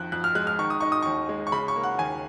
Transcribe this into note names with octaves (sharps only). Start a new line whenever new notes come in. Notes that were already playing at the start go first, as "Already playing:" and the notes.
Already playing: F2 D#3 F#6
F2 F#6
F6
G#3 F#6
F6
D#3 C#6
D#6
D#4 C#6
D#6
D#2 C#6
G#3
C#6
C#3 B5
C#6
A#3
F#5
D#2 G#5